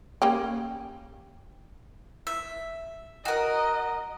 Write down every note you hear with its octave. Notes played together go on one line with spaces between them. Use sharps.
A#3 C#4 G4
E5
F#4 A#4 D#5